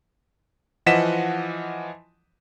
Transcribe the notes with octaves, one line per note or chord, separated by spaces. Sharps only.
E3 F3 D#5 F#5 B6 E7